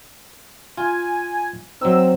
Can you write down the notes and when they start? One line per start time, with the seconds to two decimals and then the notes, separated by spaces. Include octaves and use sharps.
0.77 F4 G#5
1.81 F#3 C4 D#4 E6